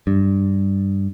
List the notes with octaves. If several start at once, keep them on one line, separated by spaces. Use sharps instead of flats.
G2